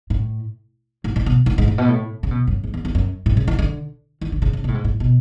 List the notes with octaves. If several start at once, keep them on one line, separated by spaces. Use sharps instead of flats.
A2
A2
A2
B2
A2
G#2
A2
B2
A2
C#3
B2
F#2
G#2
E2
E2
F#2
A2
C#3
E3
D3
E3
D3
C#3
C#3
B2
A2
G#2
A2
B2